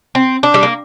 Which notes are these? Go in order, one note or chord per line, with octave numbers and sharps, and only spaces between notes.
C4
D4
G3
A#3